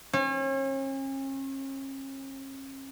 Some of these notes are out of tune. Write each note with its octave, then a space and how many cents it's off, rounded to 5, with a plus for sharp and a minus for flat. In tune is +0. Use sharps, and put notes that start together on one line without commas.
C#4 -40